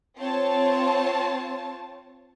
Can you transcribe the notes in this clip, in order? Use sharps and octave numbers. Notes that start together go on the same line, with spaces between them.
C4 F4 C#5 A5